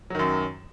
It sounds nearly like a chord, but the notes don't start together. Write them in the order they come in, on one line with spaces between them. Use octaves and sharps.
F#3 D#3 F#2